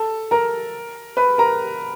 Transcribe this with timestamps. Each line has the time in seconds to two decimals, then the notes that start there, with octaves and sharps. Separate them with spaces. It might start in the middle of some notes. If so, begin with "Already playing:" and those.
Already playing: A4 A5
0.31 A#4 A#5
1.17 B4 B5
1.38 A#4 A#5